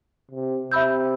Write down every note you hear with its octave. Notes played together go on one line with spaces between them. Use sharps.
C3
C3 E5 B5 E6 G6